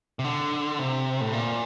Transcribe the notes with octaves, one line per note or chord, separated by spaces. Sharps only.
C3
D3
C3
A2
A#2